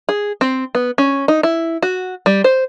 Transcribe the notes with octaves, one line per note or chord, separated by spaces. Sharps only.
G#4
C4
B3
C#4
D#4
E4
F#4
G3
C5